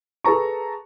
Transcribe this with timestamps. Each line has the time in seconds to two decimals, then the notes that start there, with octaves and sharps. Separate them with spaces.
0.24 G#4 A4 B4 A5 A#5 C#6